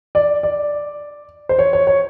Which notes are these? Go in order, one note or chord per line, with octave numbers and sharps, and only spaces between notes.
D5
D5
C5
C#5
C#5
C#5